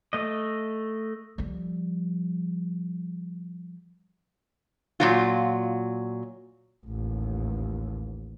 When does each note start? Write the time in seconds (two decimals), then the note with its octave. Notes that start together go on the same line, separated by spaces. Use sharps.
0.13 A3 D#5
1.38 F3 G3
5.00 A#2 F#3 F4
6.85 A1 D#2